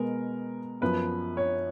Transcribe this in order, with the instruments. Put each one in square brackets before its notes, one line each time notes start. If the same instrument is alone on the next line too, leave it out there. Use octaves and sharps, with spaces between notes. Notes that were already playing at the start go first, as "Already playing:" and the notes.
Already playing: [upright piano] B2 G#3 B3 A#4
F#2 F3 B3 B4
C#5